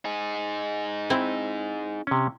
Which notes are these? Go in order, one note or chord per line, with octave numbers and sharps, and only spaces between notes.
D#4 G#4
C4 E4
C3 C#4